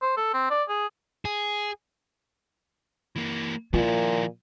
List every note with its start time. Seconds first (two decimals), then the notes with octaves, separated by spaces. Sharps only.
0.02 C5
0.17 A4
0.34 C4
0.50 D5
0.69 G#4
1.25 G#4
3.16 E3 A#3
3.74 A#2 F3 E4 F4